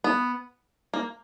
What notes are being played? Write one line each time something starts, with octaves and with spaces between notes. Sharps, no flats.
B3
A#3